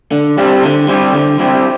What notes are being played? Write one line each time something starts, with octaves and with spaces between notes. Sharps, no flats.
D3
G3 C4 E4 G4
D3
G3 C4 E4 G4
D3
G3 C4 E4 G4